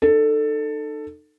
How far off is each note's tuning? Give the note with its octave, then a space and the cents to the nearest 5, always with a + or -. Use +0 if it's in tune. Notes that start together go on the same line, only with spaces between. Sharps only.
D#4 -35 A4 +10